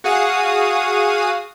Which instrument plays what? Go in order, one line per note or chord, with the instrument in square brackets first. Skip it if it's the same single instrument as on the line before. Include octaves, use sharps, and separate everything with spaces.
[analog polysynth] F#4 G#4 F5 D#6